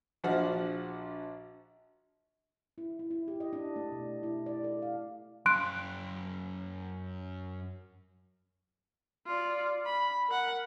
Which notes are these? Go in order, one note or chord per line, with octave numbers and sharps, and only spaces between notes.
A#1 F3 D4 F#4 F#5 F6
E4
E4
E4
G4
D#5
D4
A3
B2
E4
D5
A4
F5
F#2 F5 C6 F#6 D7
F4 D5
B5
A#4 F#5